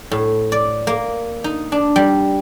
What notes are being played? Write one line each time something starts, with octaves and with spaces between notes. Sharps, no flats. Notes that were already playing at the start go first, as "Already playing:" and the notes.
A2
D5
A#3
D#4
D4
G3